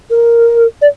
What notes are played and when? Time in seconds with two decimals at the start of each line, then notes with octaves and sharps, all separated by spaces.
0.10 A#4
0.81 D5